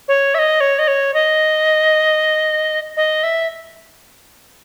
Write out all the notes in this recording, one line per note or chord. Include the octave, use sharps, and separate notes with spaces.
C#5
E5
D#5
C#5
D#5
C#5
D#5
D#5
E5